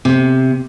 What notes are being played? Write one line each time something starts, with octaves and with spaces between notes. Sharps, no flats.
C3